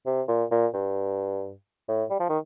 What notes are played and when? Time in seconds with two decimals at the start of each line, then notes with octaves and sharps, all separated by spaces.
0.06 C3
0.28 A#2
0.51 A#2
0.74 G2
1.88 A2
2.10 G3
2.20 F3
2.29 D#3